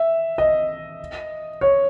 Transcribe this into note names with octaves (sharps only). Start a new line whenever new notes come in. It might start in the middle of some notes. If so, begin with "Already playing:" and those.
Already playing: E5
D#5
C#5